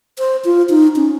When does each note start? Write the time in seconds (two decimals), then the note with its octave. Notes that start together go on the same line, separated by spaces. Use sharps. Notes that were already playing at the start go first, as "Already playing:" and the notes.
0.19 C5
0.45 F4
0.70 D#4
0.96 C#4